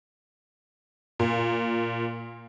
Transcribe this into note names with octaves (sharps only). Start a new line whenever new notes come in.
A#2